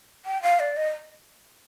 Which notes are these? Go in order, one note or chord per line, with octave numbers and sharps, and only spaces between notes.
G5
F5
D5
D#5